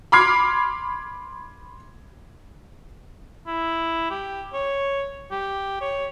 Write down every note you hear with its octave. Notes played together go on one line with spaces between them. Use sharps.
B5 C6 D6 F6 G#6 C7
E4
G4
C#5
G4
C#5